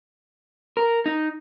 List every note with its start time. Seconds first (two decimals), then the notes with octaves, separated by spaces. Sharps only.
0.77 A#4
1.06 D#4